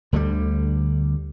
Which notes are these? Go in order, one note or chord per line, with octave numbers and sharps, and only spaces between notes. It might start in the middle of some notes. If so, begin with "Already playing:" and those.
D2 D3 F#3 G3